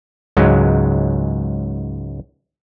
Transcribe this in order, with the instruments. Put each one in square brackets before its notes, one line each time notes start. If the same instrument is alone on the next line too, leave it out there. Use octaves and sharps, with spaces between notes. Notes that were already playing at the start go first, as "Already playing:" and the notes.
[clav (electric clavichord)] C#2 G#2 F#3 G#3